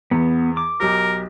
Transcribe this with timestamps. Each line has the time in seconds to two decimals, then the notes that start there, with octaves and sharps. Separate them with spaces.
0.11 E2 B3
0.57 D6
0.80 B1 G4 A#4